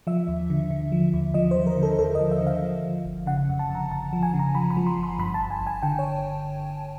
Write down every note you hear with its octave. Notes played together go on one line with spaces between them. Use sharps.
F3 E5
D#2
D3
D3
F3
D#2
F3 D#5
C5
F3
A#4
D3
A4
D#2 A4
D#5
F3
E5
D3 F5
F3
F3
G1
C#3 F#5
F2
A5
F2
A#5
G1 A5
F3
G#5
C#3
A#5
F3 B5
B5
F3
C6
G1
C6
G2 B5
A5
G1
G#5
G1
G#5
D3 G5
C#5